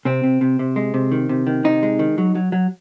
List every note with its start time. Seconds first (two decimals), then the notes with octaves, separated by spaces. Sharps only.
0.05 C3 C4
0.24 C3
0.41 C3
0.59 C3
0.76 G#3
0.94 C3
1.12 D#3
1.29 C3
1.47 D#3
1.64 C3 D#4
1.83 G#3
1.99 D#3
2.18 F#3
2.35 F#3
2.52 F#3